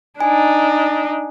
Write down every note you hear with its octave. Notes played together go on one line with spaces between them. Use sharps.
D4 D#4 G#5